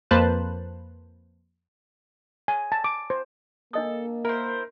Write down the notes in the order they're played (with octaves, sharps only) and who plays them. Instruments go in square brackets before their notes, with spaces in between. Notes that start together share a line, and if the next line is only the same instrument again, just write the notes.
[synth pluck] F2 A#3 B4 C5 A5 F#6
[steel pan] G#5
A5
D6
C5
[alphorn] A#3 [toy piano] D4 D#5 D#6 [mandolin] A4
[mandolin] E4 C5 [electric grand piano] A#4